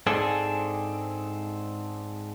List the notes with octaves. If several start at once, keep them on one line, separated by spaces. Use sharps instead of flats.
G#2 C4 D4 G#4 A4